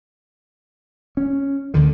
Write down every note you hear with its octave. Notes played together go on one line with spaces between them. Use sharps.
C#4
D2 D3 D#3